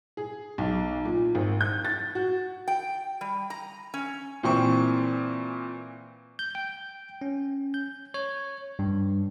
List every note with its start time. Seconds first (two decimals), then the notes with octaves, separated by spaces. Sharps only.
0.17 G#4
0.58 B1
1.05 A#2
1.35 G#1
1.61 G6
1.85 A6
2.15 F#4
2.68 G5
3.21 G3
3.50 A#5
3.94 C#4
4.43 A#2 E3 C4 C#6
6.39 G6
6.55 G5
7.21 C#4
7.74 G6
8.14 C#5
8.79 G2